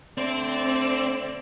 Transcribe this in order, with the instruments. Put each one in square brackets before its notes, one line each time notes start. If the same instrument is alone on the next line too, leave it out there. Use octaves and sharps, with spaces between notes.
[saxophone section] D3 A3 D5 [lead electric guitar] C4